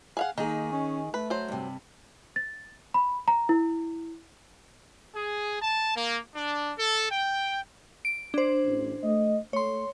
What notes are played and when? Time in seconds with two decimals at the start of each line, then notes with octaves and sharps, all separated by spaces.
0.17 G#4 F5 F#5
0.38 D#3 A#3 D#4 G#4
0.72 C#4
1.14 A3 B4
1.30 F#3 C5
1.48 G2 C3
2.36 A6
2.94 B5
3.28 A#5
3.49 E4
5.15 G#4
5.62 A5
5.96 A#3
6.35 D4
6.79 A4
7.12 G5
8.05 D7
8.34 D4 C5
8.65 A1
9.04 A3 D#5
9.53 A3 C#5 C6